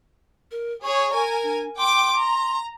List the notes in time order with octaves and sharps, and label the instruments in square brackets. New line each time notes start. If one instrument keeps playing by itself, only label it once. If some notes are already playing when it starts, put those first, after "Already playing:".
[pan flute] A#4
[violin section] G#4 C#5 [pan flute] C#6
[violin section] A#4 G#5
[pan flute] D4
[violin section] G5 D6 [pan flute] C6
[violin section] A#5